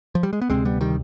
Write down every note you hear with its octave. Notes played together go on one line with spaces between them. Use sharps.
F3
G3
G#3
B3
D2 C3 G#3 C4
G3 B3
D#3 G3